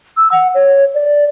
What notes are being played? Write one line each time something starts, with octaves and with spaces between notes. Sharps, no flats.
E6
F#5
C#5
D5